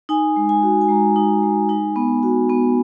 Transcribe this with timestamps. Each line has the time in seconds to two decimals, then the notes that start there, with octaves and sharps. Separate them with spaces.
0.09 D#4 G#5
0.36 G#3
0.49 G#5
0.63 F#4
0.81 G#5
0.89 G#3 A#5
1.16 D#4
1.43 G#3
1.69 D#4 G#5
1.96 B3
2.23 F#4
2.50 B3